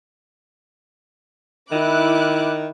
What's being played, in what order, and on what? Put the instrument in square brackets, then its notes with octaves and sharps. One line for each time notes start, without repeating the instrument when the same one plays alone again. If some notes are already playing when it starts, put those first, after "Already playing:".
[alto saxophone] D#3 [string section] E4 D6 F#6